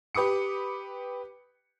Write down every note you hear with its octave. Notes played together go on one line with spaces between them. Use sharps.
G4 B4 D6 D#6 C#7